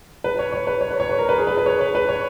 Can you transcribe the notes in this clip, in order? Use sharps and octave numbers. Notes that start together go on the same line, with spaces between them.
B4
C#5
C#5
B4
C#5
B4
C#5
B4
A#4
B4
G#4
B4
B4
C#5
B4
B4
C#5